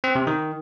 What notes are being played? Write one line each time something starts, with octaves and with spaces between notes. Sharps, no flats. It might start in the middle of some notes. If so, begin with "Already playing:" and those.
C4
C3
D#3